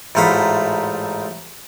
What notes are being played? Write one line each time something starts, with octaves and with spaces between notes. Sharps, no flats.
A1 G#2 A3 F4 F#5 B5